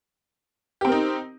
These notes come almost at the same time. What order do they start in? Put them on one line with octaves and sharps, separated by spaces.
G4 C4 A#4 D#4